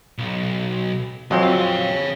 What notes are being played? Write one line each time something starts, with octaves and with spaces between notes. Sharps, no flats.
B1
F2 F#3 G#3 C4 C6
C#5 F5